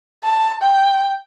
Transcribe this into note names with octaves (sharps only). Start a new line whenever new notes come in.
A5
G5